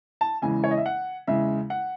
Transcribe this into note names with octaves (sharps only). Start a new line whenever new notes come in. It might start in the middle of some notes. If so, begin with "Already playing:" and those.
A5
E2 C#3 E3 G#3 G#5
C#5
D#5
E5
F#5
E2 C#3 G#3 E5
F#5